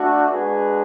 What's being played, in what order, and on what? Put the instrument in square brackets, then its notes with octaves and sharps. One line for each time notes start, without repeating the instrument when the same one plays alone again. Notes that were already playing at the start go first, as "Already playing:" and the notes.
Already playing: [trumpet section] A3 D4 F#4
G#3 B3 D4 F#4 G#4 B4